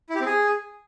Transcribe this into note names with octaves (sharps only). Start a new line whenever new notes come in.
E4
G4
C4
G#4